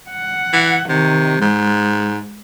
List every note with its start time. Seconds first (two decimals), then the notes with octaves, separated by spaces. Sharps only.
0.10 F#5
0.53 E3
0.89 C3 D#3
1.42 G#2 G#3